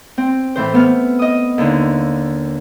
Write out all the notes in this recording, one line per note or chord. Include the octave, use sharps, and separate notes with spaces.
C4
A2 E3 C5
A3 B3 F6
D#5 D#6
D#2 D3